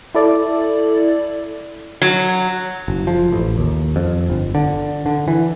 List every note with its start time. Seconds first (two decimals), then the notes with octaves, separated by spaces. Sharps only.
0.15 E4 A4 D5
2.02 F#3
2.88 F#1
3.07 F3
3.32 A1
3.58 D#2
3.96 F2
4.30 G1
4.55 D3
5.06 D3
5.28 E3